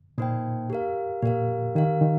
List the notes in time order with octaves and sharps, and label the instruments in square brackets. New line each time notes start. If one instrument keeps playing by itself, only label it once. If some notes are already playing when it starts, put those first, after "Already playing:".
[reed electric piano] A#2 [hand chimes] A#3 D#4 C5 G5
[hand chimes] G4 A#4 F5
[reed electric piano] A#2 [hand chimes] G4 A#4 F5
[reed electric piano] D#3 [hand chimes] G4 A#4 F5
[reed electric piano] D#3